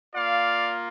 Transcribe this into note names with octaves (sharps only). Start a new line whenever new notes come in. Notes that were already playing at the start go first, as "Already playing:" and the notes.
A#3 F4 D5 F5